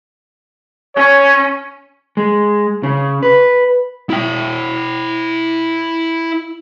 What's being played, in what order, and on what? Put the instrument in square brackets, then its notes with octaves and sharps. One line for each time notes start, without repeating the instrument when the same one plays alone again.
[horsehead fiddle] C#4 [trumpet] C#5
[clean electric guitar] G#3
C#3
B4
[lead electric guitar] E4 G5